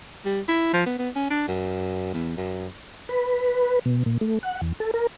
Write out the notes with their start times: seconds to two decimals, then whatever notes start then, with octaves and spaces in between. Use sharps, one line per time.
0.25 G3
0.48 E4
0.73 F3
0.86 B3
0.99 B3
1.16 C#4
1.30 D4
1.48 F#2
2.14 E2
2.37 F#2
3.09 B4
3.85 B2
4.06 A#2
4.21 A3
4.43 F#5
4.61 E2
4.80 A4
4.94 A#4